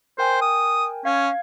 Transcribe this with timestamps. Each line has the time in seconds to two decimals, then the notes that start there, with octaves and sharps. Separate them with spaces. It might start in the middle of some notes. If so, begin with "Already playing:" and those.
0.18 A#4 C5 G5 G#5
0.41 D#6
1.05 C#4 F5 G#6